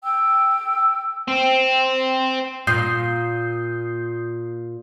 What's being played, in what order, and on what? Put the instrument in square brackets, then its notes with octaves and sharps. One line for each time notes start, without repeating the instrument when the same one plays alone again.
[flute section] G5 E6
[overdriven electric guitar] C4
[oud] A#2 [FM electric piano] D#6 G6 C7